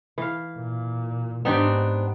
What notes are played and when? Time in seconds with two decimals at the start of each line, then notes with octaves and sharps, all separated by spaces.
0.18 E3 F5
0.57 A#2
1.45 G#2 B3 C4 D4 D#4 G4